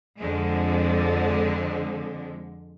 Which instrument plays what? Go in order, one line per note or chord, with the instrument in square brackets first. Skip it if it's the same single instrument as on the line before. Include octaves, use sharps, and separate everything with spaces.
[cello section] F2 D3 G#3